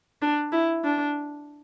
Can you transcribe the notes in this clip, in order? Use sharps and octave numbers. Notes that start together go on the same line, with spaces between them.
D4
E4
D4